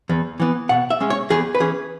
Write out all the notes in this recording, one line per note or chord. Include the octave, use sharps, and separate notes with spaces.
E2
E3 B3
B2 F#5
E5
G#3 C#4
C#5
E2 G#4
B4
E3 C#4 G#4